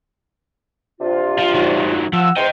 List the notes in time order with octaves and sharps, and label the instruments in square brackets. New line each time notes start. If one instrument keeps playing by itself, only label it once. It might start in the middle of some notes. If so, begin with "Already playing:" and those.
[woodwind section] C3 D4 F4
[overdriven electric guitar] F3
D#3 F#3
[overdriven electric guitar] F3 [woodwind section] F#5 E6
[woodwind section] E2 C5 [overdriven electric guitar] D#5 G5